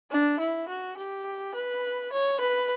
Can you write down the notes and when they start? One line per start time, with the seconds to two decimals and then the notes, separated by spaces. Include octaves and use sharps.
0.11 D4
0.40 E4
0.69 F#4
0.97 G4
1.55 B4
2.13 C#5
2.40 B4